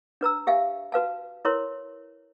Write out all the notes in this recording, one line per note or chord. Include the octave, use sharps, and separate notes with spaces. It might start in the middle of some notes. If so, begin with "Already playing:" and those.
D4 B4 A#5 E6
G4 E5 F5 G#5
F#4 B4 F5 A5
E4 A#4 B4 C#5 C6